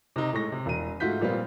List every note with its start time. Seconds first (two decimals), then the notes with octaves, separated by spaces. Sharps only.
0.16 C3 D#4
0.33 A2 G#3 C#6 A#6
0.52 C3
0.66 E1 D#7
1.00 G#2 A3 F4 F#4 G6 B6
1.21 A#2 F3 G3 B3 C4 F4